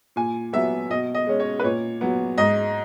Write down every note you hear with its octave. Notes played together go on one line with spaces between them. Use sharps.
A#2 G#5
F#3 B3 E5
B2 D#5
D#5
G#3 C#4
C#5
B4
A#2 C#5
F#3 B3
G#2 D#5